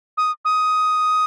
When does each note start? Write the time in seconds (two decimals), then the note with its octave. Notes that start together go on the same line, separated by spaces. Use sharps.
0.17 D#6
0.45 D#6